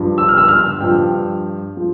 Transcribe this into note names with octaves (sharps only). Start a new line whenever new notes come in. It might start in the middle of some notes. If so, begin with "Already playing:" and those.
Already playing: G2 F3
E6
F6
E6
F6
G2 F3 G5
F3